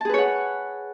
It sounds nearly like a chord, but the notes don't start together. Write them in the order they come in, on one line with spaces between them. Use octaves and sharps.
A5 G#4 B4 C#5 F#5